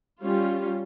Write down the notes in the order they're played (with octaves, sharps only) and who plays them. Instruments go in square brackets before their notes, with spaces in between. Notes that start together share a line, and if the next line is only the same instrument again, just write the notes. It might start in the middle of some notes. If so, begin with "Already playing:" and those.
[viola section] G3 C#4 F4